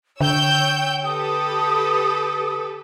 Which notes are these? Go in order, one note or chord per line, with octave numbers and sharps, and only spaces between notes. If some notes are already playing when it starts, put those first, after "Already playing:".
D3 C#5 G5 E6 G6
G4 A4 B4 D#6